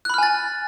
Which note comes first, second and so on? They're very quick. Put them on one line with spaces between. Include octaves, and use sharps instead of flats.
F#6 B5 F6 G#5 A6